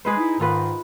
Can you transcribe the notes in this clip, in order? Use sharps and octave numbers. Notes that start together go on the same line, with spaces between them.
G#3 G#4 B4 C5
D#4 E4
G#2 D#3 D#4 F4 B4